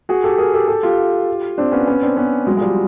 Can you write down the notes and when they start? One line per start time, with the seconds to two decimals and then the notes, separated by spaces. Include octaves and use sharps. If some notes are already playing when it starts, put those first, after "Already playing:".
0.09 F#4 G#4
0.24 G4 A4
0.38 G#4 A#4
0.54 G4 A4
0.68 G4 A4
0.83 F4 G4
1.58 C4 D4
1.72 B3 C#4
1.87 B3 C#4
2.02 C4 D4
2.17 B3 C#4
2.47 F#3 G#3
2.57 G#3
2.61 F3 G3